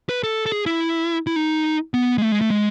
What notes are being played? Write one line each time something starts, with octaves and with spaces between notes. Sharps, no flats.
B4
A4
A4
G#4
E4
E4
D#4
B3
G#3
A3
G#3
A3
G#3